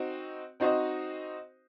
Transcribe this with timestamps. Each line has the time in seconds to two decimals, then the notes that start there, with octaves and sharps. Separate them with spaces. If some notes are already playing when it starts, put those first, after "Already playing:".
Already playing: C4 D#4 F#4
0.60 C4 D#4 F#4 C5 D#5